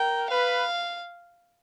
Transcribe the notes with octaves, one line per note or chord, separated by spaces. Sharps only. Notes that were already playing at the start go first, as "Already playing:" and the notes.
Already playing: A#4 G5
B4 F5